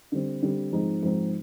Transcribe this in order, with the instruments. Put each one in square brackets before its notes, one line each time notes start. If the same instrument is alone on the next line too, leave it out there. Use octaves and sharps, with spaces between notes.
[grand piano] D3 G3 C4
D3 G3 C4
G#2 F3 G#3 C4 D#4
G#2 F3 G#3 C4 D#4